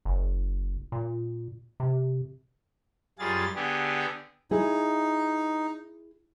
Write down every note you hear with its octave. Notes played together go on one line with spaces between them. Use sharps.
F#1
A#2
C3
F#2 G3 F4 G#4 A6
D3 B3 G4 G#4
D#4 E4 G#4